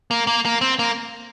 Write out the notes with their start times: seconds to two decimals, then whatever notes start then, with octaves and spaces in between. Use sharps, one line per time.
0.11 A#3
0.27 A#3
0.45 A#3
0.61 C4
0.79 A#3